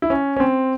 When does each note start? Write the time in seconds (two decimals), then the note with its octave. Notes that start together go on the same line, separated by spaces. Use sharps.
0.02 E4
0.10 C#4
0.36 C#4
0.40 C4